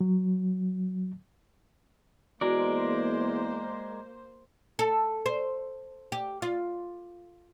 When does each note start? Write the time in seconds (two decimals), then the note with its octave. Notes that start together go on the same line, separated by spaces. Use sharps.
0.01 F#3
2.41 E2 G#3 A#3 F#4 A#4 C5 D5
4.79 A4
5.26 C5
6.12 G4
6.42 F4